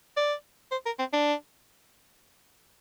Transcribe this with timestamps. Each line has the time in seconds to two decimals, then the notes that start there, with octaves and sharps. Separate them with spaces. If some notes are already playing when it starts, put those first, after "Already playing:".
0.17 D5
0.71 C5
0.86 A#4
0.99 C4
1.13 D4